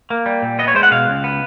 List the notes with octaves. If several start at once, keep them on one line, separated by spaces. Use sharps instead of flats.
A#3
G3
A#2
B3 D#5
C#5
G#3 C5
F#5
B2 F5
C#2
B3